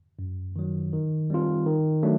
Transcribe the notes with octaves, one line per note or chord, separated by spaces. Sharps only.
F#2
D#3 F#3
D#3
G3 C4 F4
D#3
F#3 A3 D4